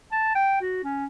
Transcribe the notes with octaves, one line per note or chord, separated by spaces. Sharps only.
A5
G5
F#4
C#4